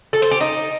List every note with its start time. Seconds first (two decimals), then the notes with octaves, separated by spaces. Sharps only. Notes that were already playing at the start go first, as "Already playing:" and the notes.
0.13 A4
0.22 C5
0.31 G4
0.41 D#4